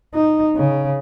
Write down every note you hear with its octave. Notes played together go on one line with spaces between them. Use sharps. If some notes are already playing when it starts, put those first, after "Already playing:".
D#4
C#3